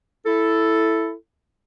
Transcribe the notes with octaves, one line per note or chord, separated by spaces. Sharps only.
E4 A4